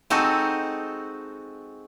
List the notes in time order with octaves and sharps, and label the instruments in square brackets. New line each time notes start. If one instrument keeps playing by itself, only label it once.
[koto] G#3 C4 D#4 F#4 A4